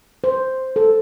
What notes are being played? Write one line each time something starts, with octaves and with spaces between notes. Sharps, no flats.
C5
A4